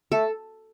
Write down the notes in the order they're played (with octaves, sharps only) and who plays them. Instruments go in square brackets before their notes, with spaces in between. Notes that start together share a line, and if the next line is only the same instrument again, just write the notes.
[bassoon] A3 [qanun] A4